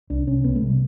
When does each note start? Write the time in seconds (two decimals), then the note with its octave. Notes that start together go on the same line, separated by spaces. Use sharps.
0.10 C2 D4
0.27 C3 C#4
0.44 C2 B3
0.55 A3
0.62 C3
0.67 G3